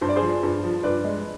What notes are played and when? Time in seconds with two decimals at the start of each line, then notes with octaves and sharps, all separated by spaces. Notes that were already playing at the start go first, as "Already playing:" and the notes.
0.01 G2 C5
0.09 D5
0.16 G#4 C5
0.22 F3
0.43 G2
0.64 F3
0.83 G2 B4 D5
1.04 G#3